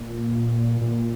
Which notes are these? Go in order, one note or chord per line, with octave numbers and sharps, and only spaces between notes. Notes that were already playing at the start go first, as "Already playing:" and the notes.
Already playing: A#2
A#2